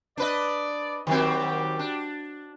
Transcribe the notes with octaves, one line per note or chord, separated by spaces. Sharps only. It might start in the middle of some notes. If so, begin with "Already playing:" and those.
D4 B4 D5 D#5
D#3 F#3 G3 C4 G4
D4